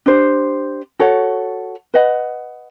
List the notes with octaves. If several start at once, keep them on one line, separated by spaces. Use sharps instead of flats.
D4 G4 C5
F#4 A4 C#5 F#5
B4 D#5 F#5